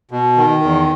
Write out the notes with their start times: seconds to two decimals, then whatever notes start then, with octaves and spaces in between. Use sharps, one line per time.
0.11 B2
0.37 D#3
0.63 E2